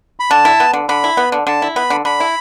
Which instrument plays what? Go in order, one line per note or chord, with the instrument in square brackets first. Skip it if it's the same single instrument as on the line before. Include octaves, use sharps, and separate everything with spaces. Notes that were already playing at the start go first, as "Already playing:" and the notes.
[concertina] B5
[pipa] D3 [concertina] A5
[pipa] E4
B3
D3
[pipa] D3 [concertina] B5
[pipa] E4
B3
D3
[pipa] D3 [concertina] A5
[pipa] E4
[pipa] B3 [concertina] B5
[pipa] D3
[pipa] D3 [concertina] B5
[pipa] E4